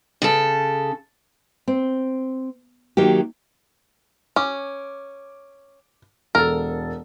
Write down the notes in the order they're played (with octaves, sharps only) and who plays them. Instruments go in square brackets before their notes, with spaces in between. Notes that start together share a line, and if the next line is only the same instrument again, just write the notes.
[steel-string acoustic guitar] C#3 A4
[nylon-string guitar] C4
D#3 F#3 A#3 G4
[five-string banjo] C#4 [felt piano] D6
[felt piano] E1 A4 [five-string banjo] A#4